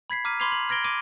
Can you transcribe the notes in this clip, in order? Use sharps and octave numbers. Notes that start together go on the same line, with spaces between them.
B5 G#6 B6 C7
A#5 D6 F6 B6 D#7
B5 C6 D6 G#6 C7 F7
F#7
F6 G#6 A#6 D7 G7
D6 D7 D#7